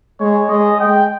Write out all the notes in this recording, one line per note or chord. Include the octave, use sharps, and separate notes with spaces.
G#3 C#5
G#3 D#5
G#3 G5